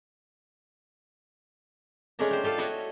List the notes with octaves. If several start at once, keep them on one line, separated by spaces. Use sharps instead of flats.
G#3 A3 C#4 D4 A#4 A#5
G4 C5
F4 G4 A4 F5
E4 F#4 C#5 D#5